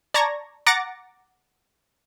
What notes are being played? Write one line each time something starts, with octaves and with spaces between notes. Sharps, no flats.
D5 A5 A#5 C#6 G#6 A#6
F#5 A#5 D6 A6 A#6 C#7